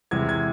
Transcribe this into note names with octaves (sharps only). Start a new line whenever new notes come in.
E2 C3 E3 G#3 G#6
G#6